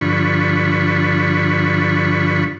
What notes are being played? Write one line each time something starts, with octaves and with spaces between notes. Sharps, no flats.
G2 D3 F3 B5 C#6